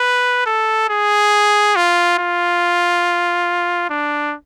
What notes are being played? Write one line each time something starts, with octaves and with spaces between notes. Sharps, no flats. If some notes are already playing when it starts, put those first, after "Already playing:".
Already playing: B4
A4
G#4
F4
F4
D4